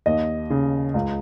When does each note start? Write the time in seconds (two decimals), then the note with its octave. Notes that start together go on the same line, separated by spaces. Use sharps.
0.06 D#2 D#5
0.50 C#3
0.94 C#2